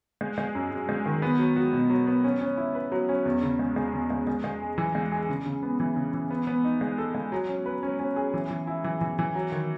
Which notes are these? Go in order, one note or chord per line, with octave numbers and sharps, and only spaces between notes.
G#3
G#3
F#2
F#2
G#3
D#3
B3
F#3
F#4
B2
F#3
B3
C#4
C#4
E4
B4
F#3
C#4
E2
C#3
G#3
G#3
E2
G#3
G#3
G#3
G#4
E3
G#3
G#4
C#3
C#3
B3
E3
C#3
E3
B3
B3
D#4
G#3
A4
G#3
F#3
C#4
B4
C#4
C#4
G#4
E3
E3
E4
E3
E3
E3
F#3
D#3